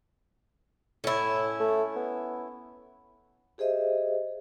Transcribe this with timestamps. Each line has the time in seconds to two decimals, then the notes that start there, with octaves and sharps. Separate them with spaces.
1.04 A2 C#4 E4
1.60 A3
1.96 B3
3.58 G4 G#4 C5 D#5 E5